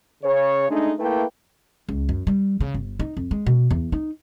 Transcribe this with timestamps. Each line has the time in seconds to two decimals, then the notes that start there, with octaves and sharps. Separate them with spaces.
0.22 C#3 C#5
0.69 G#3 A3 D4 D#4
0.99 A3 A#3 E4 B4 G5
1.89 C#2
2.09 F#2
2.27 G3
2.61 C#3
2.74 G1
2.99 D#4
3.17 F2
3.31 G#3
3.47 B2
3.71 E2
3.92 D#4